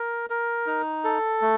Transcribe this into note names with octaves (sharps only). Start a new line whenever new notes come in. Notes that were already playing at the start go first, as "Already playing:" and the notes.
Already playing: A#4
A#4
D#4
A4
A3